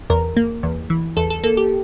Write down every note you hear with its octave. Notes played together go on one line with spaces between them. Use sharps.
E2 A#4
A#3
E2
E3
E2 A4
A4
A#3 A4
G4